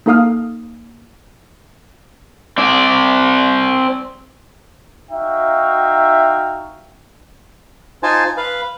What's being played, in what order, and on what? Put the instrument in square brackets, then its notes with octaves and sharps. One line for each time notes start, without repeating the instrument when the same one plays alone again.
[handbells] A#3 D#4 A4 F5 D#6 F6
[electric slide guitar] C4 D5
[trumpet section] D#4 F#4 E5 F5 G5
[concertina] D#4 F4 C5 G#5 A5
B4 F5